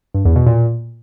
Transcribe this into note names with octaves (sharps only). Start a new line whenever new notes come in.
G2
E2
B2
A#2